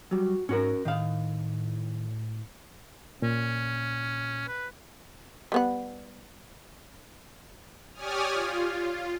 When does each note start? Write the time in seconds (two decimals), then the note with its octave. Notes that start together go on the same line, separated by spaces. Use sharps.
0.11 F#3 G3 F#4
0.49 G#2 C#4 F#4 A#4
0.85 A2 D#3 F5
3.22 A#2 C#4
4.48 B4
5.52 G3 B3 F#5
7.94 G4 C#5 D5 G#5 D#6 F6
8.32 F4